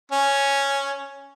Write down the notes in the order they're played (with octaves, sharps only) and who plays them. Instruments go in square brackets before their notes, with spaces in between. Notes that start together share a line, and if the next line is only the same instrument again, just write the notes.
[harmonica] C#4